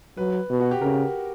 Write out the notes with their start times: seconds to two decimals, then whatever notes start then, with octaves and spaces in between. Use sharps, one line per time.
0.17 F#3 B4
0.50 B2
0.60 F#4
0.71 G4
0.81 C#3 A#4